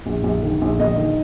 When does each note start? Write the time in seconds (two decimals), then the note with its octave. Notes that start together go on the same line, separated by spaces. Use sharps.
0.06 A#1
0.23 A#1
0.43 D#3
0.61 A#1
0.80 A#1 D#5
0.97 D#3